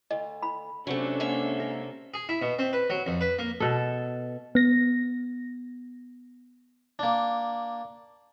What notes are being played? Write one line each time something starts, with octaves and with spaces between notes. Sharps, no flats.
D2 D#5
B5
C3 F#3 A3 C#4 D4 A4 F#5 C#6
G#2 A#3 E5
A#4
G#4
E4
B2
C4
B4
F#3
F2
B4
A#3
B2 A4
B3 A#6
A#3 D4